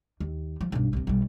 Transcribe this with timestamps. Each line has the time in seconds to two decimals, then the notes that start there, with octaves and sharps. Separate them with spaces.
0.20 D#2
0.61 F3
0.72 B1 G2
0.93 C2 C3
1.07 B1 G3